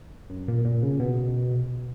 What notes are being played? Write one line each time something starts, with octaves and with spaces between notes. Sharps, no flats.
F#2
A#2
A#2
C#3
B2